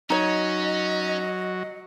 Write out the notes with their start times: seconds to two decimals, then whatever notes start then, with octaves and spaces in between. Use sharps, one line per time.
0.10 F#3 C#4 D#4 C#5 D#5